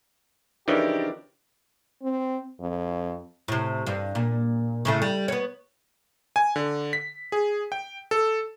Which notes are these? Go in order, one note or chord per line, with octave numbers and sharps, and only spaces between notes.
C#3 E3 F3 D4 D#4 G4 A#4 D5
C4
F2
A2 C3
G2
A#2
A2 C#3 A3
G3
B3 C#5
G#5
D3
B6
G#4
G5
A4